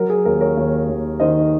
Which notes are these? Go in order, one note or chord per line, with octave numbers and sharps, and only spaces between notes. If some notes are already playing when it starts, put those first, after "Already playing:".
Already playing: F#3 A#4
G#4
D#2 A#4
A#4 C#5
D#2
D#2
D#3 C5 D#5